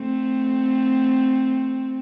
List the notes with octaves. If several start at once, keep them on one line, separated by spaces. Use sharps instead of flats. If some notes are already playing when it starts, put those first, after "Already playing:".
Already playing: A3 C4